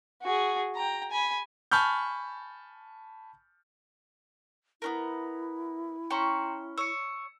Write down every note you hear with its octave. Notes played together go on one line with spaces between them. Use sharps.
F#4 G#4
G5 A#5
G#5 B5
G#5 A5 B5 C#6 F6 G6
B3 C#4 E4 A#4
C#4 G5 A#5 C6
C#5 E6 C#7